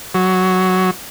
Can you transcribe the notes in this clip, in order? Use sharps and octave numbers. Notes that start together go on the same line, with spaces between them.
F#3